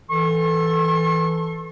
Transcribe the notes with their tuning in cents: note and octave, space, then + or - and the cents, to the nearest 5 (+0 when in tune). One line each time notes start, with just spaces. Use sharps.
E3 +0 A4 +0 C#6 -45